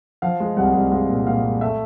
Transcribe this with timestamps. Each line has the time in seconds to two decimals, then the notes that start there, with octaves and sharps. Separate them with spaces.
0.22 F3 F5
0.40 G#3
0.56 C2 F#5
0.74 C2
0.91 G#3 F5
1.09 A#2
1.27 A#2 F5
1.44 G#3
1.61 A3 E5